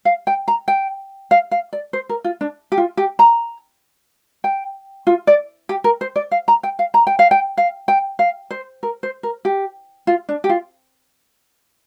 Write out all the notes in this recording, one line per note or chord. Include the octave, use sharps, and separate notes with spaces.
F5
G5
A#5
G5
F5
F5
D5
C5
A#4
F4
D4
G4
F4
G4
A#5
G5
F4
D5
G4
A#4
C5
D5
F5
A#5
G5
F5
A#5
G5
F5
G5
F5
G5
F5
C5
A#4
C5
A#4
G4
F4
D4
G4
F4